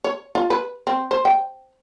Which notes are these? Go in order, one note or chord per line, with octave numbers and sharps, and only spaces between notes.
C#5
F4
B4
C4
C5
G5